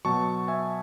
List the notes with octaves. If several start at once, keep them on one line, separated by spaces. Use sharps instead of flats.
B2 F#3 A5 C#6
E5 G#5